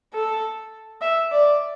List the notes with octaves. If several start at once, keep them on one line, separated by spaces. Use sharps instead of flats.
A4
E5
D5